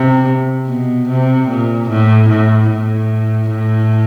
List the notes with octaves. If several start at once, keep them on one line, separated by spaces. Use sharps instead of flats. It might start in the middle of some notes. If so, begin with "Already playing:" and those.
Already playing: C3
B2
C3
A#2
A2
A2
A2
A2